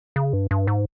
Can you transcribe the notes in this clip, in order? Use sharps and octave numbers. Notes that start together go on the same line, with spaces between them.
C#3
G2
G2
G#2